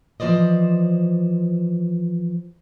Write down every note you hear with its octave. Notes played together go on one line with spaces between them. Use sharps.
E3 F3 C5 D5 D#5